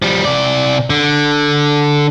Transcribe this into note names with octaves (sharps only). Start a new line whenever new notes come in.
F3 G3
C3 D5
D3